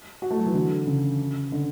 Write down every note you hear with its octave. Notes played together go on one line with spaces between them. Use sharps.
F#4
A3
F#3
E3
D3
C#3
D3